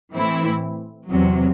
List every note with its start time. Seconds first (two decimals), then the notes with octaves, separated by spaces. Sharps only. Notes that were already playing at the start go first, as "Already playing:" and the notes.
0.13 A2 E3 C4 E4
1.08 E2 C3 F#3